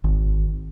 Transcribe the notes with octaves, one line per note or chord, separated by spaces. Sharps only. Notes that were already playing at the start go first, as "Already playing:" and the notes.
G#1